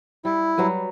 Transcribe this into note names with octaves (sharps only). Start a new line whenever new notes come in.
G3 E4
F#3 G3 B4